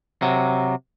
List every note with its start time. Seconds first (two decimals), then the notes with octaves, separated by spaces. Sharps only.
0.22 C3 F#3